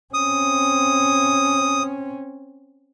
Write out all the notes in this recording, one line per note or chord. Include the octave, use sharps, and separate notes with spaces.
C4 C#4 D#6